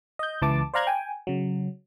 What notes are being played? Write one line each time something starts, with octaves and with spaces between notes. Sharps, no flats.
D#5 G6
C#2 E3 A5 D6
C5 D5 F5 A#5 F#6 G#6
G5 G#5
C#3 F#3